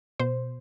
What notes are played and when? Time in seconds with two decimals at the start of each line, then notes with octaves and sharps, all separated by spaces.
0.19 B2 C5